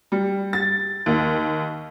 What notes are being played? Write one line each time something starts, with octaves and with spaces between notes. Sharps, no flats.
G3
A6
D#2